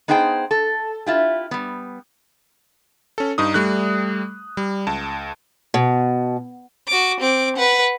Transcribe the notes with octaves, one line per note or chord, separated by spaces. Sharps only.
B3 D#4 G#4 C5 G5
A4
E4 F4 G4
G3 B3
C#4 A4
G2 D#4 D#6
G3 A3 F#6
G3
C#2 A5
B2
F#4 D6
C4 D6
B4 F#5